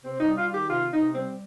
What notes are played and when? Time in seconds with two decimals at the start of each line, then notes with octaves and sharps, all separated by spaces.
0.03 C3 C4
0.20 D#4
0.25 G3
0.36 F4
0.47 D#3
0.54 G4
0.69 C3 F4
0.92 C3 D#4
1.13 G3 C4